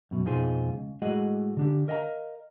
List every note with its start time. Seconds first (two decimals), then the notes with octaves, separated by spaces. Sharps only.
0.11 F#2 B2
0.25 F2 B2 D#4 F4 G#4 C5
0.69 C#2
1.02 A2 G#3 F#4 G#4 D#5 F#5
1.57 D3 D4 G4
1.88 A#4 D#5 F5 G5 A#5